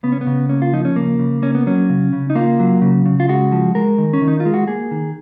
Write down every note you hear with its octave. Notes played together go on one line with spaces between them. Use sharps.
C#3 B3
C#4
B3
C#3
A#3 C#4
F4
F3 D#4
C#4
C#3 A#3
C#3
A#3 C#4
B3
F#3 C#4
C#3
C#3
D#4
A#3 F4
F#3
C#3
C#3
F4
G#3 F#4
F3
G#3 A#4
D#3
C#4
D#3
D#4
F4
G#3
F#4
A#3 G#4
D#3